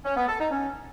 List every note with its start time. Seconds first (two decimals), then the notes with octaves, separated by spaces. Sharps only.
0.05 C#4
0.16 B3
0.28 A4
0.40 D#4
0.51 C#4